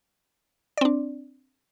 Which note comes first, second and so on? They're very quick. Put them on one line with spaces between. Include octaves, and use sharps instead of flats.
D5 C4 D4